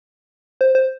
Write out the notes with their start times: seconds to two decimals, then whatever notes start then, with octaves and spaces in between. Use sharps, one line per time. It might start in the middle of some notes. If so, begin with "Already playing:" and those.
0.61 C5
0.75 C5